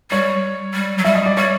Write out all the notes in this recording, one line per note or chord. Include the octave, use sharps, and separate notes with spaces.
G3 C#5
G3
F#3
G3 E5
D#5
D5
G3 C#5